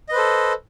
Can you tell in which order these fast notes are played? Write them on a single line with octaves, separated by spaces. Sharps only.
D#5 B4 C5 A4